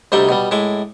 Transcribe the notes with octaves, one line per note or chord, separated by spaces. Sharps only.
D2 C3 G3 D#4 E5 G5
B2 G3
A2 G#3 E5 D6